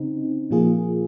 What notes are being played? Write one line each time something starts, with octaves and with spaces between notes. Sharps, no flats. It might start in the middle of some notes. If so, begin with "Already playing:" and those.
Already playing: C#3 C4 D#4
A#2 F3 A#3 F4 G#4